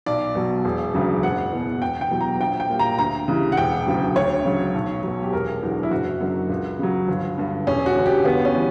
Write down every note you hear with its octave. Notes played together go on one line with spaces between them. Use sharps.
B1 D5
B2 F#3
E1
D2 C#3 F#3
F#1 F#5
E2 B2
E1 G5
G5
E2 B2 F#3
A#5
A#1 G5
G5
A#2 G3
A#5
D2 A#5
C#3 E3 G3
F#5
E1 G5
D2 C#3 F#3
D2 C#5
C#3 F#3
B1
B2 F#3
G4
E1 A#4
E2 D3 F#3
E4
F#1 F#4
F#2 D3 F#3
C#2
C#3 F#3
G1
G2 D3
E1 C#4
F#4
D2 D3
G4
G1 B3
C#4
E3 G3